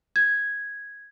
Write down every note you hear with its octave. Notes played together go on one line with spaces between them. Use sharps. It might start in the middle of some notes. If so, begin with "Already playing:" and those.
G#6